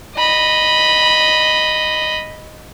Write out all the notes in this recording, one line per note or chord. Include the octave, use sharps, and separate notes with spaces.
D#5 B5